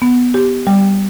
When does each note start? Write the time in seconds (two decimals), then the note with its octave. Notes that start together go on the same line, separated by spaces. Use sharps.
0.02 B3
0.34 G4
0.67 G3